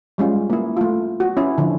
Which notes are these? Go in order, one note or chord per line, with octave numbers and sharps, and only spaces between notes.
G3 G#3 C#4 F4
A#3 E4
A3 F4
F#4
C#4 E4
D3 F3